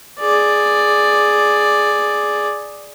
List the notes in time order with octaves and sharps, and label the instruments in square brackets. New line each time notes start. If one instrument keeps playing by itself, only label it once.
[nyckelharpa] G#4 D5